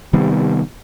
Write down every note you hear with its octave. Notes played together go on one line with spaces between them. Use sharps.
C3 D#3 G3 B3